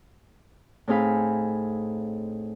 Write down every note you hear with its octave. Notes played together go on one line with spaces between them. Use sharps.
A2 C4 D#4 G#4 F5 B5